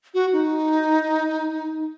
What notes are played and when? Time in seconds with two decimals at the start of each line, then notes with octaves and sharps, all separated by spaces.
0.14 F#4
0.33 D#4